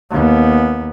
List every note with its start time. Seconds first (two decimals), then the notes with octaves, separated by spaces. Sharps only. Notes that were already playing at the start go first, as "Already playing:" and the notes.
0.11 D#2 B3